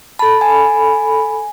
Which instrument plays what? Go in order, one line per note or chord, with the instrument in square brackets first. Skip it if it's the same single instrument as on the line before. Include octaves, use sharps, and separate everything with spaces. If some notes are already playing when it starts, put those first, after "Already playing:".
[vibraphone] A4 B5 [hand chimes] A5
[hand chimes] G#5